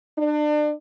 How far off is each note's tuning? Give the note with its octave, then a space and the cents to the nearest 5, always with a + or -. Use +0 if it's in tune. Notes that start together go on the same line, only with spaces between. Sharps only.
D4 +35